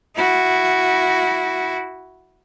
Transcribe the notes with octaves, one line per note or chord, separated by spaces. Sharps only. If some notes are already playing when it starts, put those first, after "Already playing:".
E4 F#4